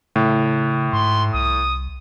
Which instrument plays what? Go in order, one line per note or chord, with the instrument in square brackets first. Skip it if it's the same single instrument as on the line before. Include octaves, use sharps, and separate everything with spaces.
[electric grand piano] A2 [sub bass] C#3
[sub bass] G#2 [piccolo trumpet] C6
[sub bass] C2 [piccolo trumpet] D#6